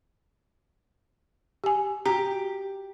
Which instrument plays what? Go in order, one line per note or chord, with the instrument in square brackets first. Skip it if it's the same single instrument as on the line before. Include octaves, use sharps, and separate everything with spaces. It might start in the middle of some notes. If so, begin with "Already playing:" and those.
[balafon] G4 G#5
[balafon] F#4 A#5 [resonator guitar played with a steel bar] G4